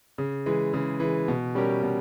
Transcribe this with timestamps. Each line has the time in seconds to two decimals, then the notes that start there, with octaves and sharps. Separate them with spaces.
0.18 C#3
0.46 E3 G#3
0.74 C#3
1.00 E3 G#3
1.28 B2
1.55 G3 C#4 G4 A#4
1.83 B2